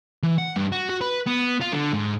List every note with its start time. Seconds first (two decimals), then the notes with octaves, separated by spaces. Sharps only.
0.23 E3
0.38 F#5
0.57 G2
0.72 F#4
0.89 F#4
1.01 B4
1.26 B3
1.61 F4
1.72 D3
1.93 G#2